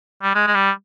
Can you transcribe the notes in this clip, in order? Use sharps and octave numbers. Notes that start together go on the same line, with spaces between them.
G3
G#3
G#3
G3